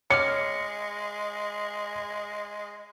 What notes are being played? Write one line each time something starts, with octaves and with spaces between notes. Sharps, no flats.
G#3 C#5 D6 F6 C#7